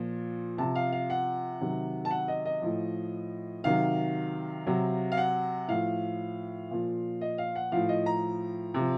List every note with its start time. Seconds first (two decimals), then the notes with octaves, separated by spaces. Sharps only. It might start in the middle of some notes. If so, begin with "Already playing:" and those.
Already playing: A#2 F3
0.58 C3 F3 A5
0.75 F5
0.92 F5
1.10 F#5
1.60 C3 D#3 F#3
2.05 A5
2.11 F#5
2.28 D#5
2.45 D#5
2.62 A2 F3
3.64 C3 D#3 F#3 F5
4.67 C3 F#3
5.12 F5
5.17 F#5
5.68 A2 F3 F5
6.71 A#2 F3
7.21 D#5
7.38 F5
7.55 F#5
7.72 A2 F3 F5
7.89 D#5
8.06 A#5
8.74 C3 F3